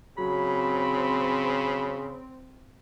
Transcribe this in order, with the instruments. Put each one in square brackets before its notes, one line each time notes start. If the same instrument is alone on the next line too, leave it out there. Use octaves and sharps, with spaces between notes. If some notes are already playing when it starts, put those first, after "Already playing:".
[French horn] C#3 [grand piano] F#3 [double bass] C4 [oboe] B5